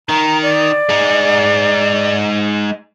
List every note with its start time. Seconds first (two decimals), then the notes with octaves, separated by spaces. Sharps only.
0.09 D#3 A#5
0.43 D5
0.89 G#3 D#4